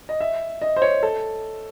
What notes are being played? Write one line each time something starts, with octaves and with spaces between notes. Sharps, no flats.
D#5
E5
D#5
C5
C#5
A4